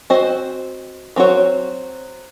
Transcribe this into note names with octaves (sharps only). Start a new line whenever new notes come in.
C4 F#4 C5 D#5
F#3 C4 F#4 C#5